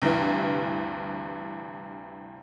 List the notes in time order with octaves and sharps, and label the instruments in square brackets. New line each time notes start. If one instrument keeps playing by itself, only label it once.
[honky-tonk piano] D2 G2 C3 E3